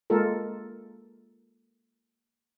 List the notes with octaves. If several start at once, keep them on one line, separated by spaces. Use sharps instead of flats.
G#3 A#3 F4 A4 A#4